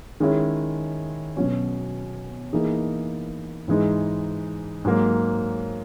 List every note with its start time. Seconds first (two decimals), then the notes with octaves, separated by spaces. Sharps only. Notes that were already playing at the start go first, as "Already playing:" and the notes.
0.20 D#3 G#3 C#4 E4
1.37 B2 F#3 C#4
2.53 E3 A#3 D#4 G#4
3.68 G#2 E3 G#3 D#4
4.85 G#2 F#3 A#3